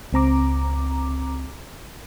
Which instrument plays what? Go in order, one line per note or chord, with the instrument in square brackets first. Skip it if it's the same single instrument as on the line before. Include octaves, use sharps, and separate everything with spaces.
[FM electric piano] C#2 C4 A#5 D6